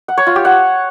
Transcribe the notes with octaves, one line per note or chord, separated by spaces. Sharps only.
F#5
C#5
F4
G4
F#5